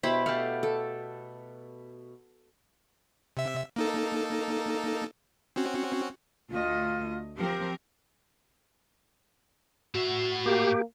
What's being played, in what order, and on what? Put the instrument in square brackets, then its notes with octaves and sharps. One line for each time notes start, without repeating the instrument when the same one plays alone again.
[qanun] B2 B5 D6 [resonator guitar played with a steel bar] E4 G4 C5
[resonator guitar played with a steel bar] A3 G4 [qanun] A4 F5 F#5
[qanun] A4
[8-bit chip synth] C3 E5
A#3 D#4 A4
C4 C#4 F#4
[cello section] D2 A3 D#5 [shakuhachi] F4
[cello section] F3 C4 A#4 [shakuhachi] G4
[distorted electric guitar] A2 E5 [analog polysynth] F#4
[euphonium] A#3 [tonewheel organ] G4